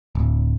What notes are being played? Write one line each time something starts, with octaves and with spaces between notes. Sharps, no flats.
D1